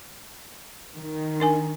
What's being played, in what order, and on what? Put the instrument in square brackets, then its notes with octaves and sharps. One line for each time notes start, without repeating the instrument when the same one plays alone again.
[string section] D#3
[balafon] D4 A#4 G#5